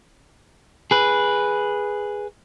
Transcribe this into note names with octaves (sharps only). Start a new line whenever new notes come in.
G#4 B4